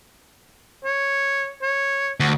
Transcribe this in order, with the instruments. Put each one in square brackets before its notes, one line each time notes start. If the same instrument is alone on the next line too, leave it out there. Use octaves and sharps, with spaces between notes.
[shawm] C#5
C#5
[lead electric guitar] D2